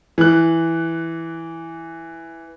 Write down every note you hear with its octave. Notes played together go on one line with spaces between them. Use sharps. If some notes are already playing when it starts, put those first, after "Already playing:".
E3 F#6